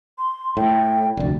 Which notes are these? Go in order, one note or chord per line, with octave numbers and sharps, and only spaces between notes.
C6
A2 G5
F1 D2 D5